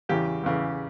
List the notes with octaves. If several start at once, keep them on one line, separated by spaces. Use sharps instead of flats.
E2 C#3 E3 G4
E2 C#3 E3